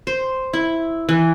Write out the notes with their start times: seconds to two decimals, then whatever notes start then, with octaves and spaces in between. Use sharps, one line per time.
0.07 C5
0.53 E4
1.09 E3